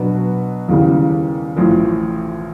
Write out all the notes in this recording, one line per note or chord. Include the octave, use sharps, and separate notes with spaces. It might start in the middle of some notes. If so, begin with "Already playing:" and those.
Already playing: B2 F#3 B3 D4 F#4
D#2 C#3 E3 G3
A1 A2 F3